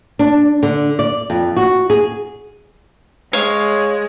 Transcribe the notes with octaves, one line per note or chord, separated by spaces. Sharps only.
D4
D3
D5
F2
F#4
G#4
G#3 C#5 F5